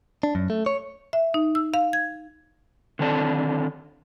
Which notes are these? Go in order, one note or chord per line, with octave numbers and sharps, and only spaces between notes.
D4
F#2
A3
C#5
E5
D#4
E6
F5
G#6
D3 D#3 C4 D4 A4